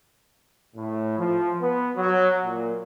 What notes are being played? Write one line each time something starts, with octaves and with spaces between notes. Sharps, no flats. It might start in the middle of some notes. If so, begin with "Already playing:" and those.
A2
F3
B3
F#3
A#2